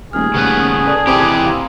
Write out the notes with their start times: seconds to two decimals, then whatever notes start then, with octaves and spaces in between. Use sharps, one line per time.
0.13 D#1 A3 G4 G#4 F6
0.34 D#1 C#3 B3
0.87 A4 D5 A5
1.07 C3 E3 G4 B5
1.46 F5 A#5 C6